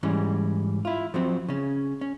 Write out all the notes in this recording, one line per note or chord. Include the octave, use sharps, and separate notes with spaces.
G#2 E3 G3 C#4
E4 F4
F3 F#3 C4
C#3 C#4
C#4